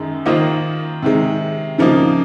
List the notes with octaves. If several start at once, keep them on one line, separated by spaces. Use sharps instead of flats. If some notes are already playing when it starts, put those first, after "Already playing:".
Already playing: F#2 D#3 G#3 D#4
D#3 A#3 F4 C5 D#5
C3 D#3 G#3
C#3 F3 A#3 D#4